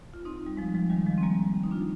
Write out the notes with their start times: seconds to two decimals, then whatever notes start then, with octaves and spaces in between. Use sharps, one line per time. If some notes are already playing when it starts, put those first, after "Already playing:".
0.14 F4
0.25 C4 D#4
0.46 G3
0.57 F3 G#3
0.75 F3 G#3
0.90 D#3 G3
1.07 F3 G#3
1.18 C4
1.23 G3 A#3
1.63 D#4
1.71 D4 F4